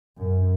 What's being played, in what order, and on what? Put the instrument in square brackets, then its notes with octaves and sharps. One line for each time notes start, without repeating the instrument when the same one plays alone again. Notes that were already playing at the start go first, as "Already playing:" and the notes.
[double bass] F#2